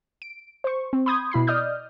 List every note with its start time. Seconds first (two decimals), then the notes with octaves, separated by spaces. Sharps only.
0.22 D7
0.64 C5 C#6
0.93 C4
1.06 B5 C6 D#6 G6 G#6
1.32 B2 E4 B5 C7
1.47 D5 D#5 D#6 F6 G6